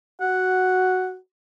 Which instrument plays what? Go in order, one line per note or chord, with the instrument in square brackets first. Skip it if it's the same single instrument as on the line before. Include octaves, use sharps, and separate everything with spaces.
[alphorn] F#4 [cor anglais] F#5